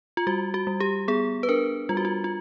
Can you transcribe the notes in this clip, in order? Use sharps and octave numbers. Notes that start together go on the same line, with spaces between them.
F4
G3 F#4
F#4
G3
G4
B3 G#4
B4
D4 A#4
G3 F4
F#4
F4
F4